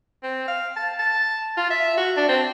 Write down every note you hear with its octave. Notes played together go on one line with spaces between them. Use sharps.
C4
F5
A5
A5
F4
E5
F#4
D4
C4